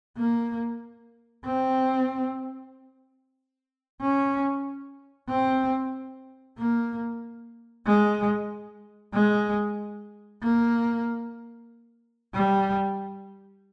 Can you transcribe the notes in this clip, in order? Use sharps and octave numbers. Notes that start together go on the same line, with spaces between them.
A#3
C4
C#4
C4
A#3
G#3
G#3
A#3
G3